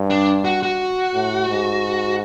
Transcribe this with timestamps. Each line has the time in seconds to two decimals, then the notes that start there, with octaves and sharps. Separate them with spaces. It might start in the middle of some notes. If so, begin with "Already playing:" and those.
Already playing: G2
0.10 D4
0.45 F#4
0.63 F#4
1.14 A2
1.49 G#2